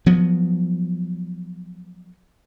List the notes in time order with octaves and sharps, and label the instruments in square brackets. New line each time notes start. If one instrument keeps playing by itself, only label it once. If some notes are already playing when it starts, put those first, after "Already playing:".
[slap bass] F3 F#3 B3